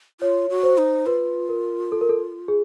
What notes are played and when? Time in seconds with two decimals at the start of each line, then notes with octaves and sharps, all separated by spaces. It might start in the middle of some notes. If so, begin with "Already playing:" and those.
0.21 F4 C#5
0.50 F#4
0.63 C5
0.78 D#4
1.06 F4 B4
1.49 A#4
1.92 A4
2.01 A#4
2.09 A4
2.48 G#4